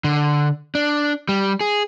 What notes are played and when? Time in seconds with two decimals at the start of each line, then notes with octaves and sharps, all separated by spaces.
0.04 D3
0.75 D4
1.29 G3
1.61 G#4